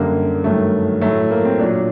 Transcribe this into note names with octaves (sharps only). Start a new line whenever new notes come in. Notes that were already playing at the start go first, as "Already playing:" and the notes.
Already playing: F#2 D3 G3 A#3
G2 D#3 F#3 A3
A2 F#3 A3
A#3
C4
A#2 F#3 D4